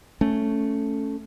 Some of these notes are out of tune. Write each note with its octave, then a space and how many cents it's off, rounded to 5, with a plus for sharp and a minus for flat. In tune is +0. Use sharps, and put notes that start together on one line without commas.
A3 +0 C#4 +0